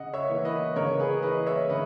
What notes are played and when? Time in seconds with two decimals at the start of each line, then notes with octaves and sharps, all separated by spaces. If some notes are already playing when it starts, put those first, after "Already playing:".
Already playing: C#3 D#5 F#5
0.13 C#5 E5
0.29 E3 A#3
0.45 B4 D#5
0.76 C#3 A#4 C#5
1.00 G#4 B4
1.22 E3 A#3 B4 D#5
1.47 C#5 E5
1.70 C#3 B4 D#5